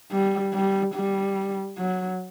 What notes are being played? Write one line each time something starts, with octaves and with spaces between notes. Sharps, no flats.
G3
G3
G3
F#3